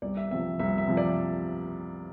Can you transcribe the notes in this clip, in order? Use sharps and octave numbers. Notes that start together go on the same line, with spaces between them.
C2 D5
E5
C3 F3 E5
C2 E5
E5
C3 F3
D5